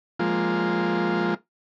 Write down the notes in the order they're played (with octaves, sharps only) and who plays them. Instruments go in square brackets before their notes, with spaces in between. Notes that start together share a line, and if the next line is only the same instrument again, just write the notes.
[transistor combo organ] F3 G#3 A#3 F4